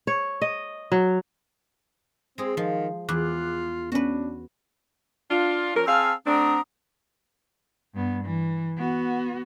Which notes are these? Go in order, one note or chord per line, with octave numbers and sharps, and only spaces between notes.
C#5
D#5
F#3
G#3 C4 G#4
D#3 F3
E2 F4 D6 F#6
B3 C#4 D4 F#4 B4
D4 F4
F3 C#4 A#4
C4 G#4 F5 A5 B5 E6
A3 C4 D4 F#5 A#5 D#6
G2 B3
E3
B3 F#4